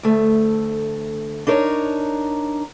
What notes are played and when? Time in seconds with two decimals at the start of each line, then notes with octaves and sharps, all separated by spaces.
0.03 D2 A3
1.47 D4 D#4 A#4 C#5